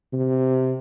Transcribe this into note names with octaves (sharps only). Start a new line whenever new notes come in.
C3